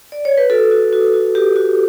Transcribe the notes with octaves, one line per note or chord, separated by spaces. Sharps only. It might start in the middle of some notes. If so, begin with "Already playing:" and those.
D5
C#5
B4
F#4 A4
F#4
F#4
F#4
F#4 G4
F#4